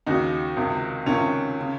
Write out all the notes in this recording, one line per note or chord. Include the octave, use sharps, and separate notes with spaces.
D#2 C#3 D#4 F#4
C#2 C3 D#3
C#2 C3 D#3 C#4 F4
C#3